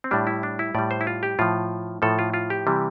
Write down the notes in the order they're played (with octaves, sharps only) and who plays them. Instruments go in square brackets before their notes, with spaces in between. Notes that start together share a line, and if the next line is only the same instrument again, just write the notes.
[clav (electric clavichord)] C4
A2 G3 D4
E4
D4
E4
A2 G3 D5
C5
E4
F4
G4
A2 F3 F4
A2 F3 A4
F4
F4
G4
C3 E3 G3